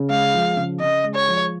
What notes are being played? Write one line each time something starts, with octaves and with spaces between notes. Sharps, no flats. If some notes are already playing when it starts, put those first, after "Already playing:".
Already playing: C#3
G#3 F5
F3
C#3
C#3 D#5
G#3
C#5
F3